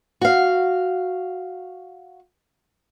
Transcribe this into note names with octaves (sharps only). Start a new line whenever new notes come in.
F#4 F5